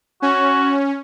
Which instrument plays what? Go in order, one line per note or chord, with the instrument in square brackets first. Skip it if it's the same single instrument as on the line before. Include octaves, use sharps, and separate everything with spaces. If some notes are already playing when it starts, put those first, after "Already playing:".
[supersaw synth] C#4 [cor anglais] F#4